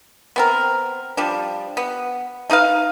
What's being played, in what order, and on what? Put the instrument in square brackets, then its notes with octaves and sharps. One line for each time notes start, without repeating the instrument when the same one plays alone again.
[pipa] B3 C4 A#4
F3 G3 D4
B3
A3 D#4 B4 F5